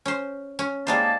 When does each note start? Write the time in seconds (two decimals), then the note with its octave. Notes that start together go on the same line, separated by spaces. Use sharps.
0.06 C#4 C5
0.59 C#4
0.87 G#2 G3 G#3 A#3 C5 A5